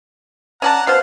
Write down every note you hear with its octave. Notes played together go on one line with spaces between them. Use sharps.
C#4 D5 F#5 A5 A#5
B2 C5 F5